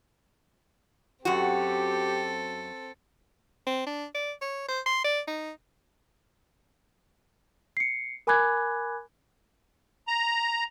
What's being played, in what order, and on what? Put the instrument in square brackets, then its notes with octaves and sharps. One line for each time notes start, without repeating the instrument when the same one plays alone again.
[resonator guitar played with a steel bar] F#2 F#4 [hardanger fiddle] C4 A4 [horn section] G4
[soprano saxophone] C4
D4
D5
C#5
C5
C6
D5
D#4
[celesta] C7 C#7
A#4 G#5 B5 D6 F#6 G#6
[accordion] A#5